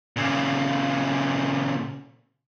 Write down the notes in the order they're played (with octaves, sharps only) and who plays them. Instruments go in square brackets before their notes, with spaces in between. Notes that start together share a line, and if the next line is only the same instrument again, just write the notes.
[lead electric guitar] A#2 C#3